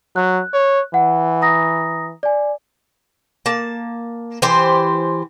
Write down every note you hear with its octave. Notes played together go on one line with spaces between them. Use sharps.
F#3 F#6
C#5
E3 F#5
A#5 D#6 A#6
D5 G#5
A#3 A5
E3 G4 C5